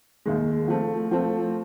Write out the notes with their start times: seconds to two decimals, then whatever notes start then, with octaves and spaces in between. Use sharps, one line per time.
0.26 D#2 D#3 G#3
0.68 F3 A3 C4
1.11 F3 A3 C4